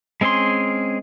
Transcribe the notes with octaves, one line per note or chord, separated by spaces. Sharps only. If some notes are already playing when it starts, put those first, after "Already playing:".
G#3 C4 C#4 G#4 C6